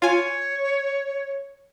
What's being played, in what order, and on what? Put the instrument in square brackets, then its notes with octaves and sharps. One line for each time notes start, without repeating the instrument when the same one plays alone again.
[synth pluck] F4 G#5 [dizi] C#5